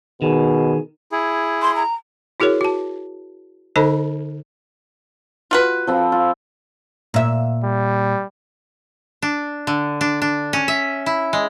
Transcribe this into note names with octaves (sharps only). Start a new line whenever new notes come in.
B2 D#3 G#4
E4 G#4
C6
A#5
E4 F#4 G#4 A#4 C#5
F#4 A5
D3 D#4 A4 C5 D#5 A5
F4 F#4 B4
F3 C4 B5
F4
A#2 E5
G3
D4
D3
D4
D4
C#4
E5
E4
G#3